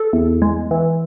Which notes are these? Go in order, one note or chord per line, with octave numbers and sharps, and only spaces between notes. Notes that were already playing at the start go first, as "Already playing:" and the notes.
Already playing: A4
E2
G#3
E3